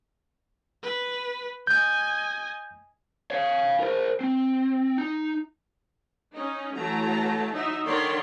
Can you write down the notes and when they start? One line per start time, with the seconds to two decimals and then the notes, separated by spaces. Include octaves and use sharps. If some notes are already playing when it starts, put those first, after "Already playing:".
0.83 B4
1.67 D#5 G#5 G6
3.31 C#5 F5
3.80 A#4 C5
4.21 C4
4.98 D#4
6.34 C#4 D#4
6.74 E3 F#3 A3 A5 A#5
7.53 F#3 D#4 E5
7.87 D3 D#3 A#4 C#5 D5 C6